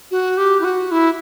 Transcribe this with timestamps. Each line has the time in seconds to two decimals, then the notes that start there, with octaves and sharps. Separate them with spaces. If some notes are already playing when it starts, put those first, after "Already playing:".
0.11 F#4
0.37 G4
0.60 E4
0.64 F#4
0.91 E4